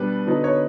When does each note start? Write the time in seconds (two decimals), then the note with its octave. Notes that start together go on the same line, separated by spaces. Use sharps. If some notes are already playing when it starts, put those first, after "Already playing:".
Already playing: B2 G3 D4 B4
0.26 D3 F#3 B3 D#4
0.44 C#5